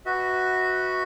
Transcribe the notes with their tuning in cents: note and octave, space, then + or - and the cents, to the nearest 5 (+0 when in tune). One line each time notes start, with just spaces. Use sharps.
F#4 +0 B4 +0 E5 -35